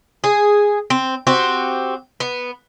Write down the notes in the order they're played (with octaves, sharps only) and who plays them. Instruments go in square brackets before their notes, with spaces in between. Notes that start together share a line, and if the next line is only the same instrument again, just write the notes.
[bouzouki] G#4
C4
C4 F#4 G4
B3